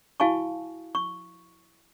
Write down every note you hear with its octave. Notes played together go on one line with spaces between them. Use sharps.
E4 F#4 F5 G#5 A5 C#6
C#6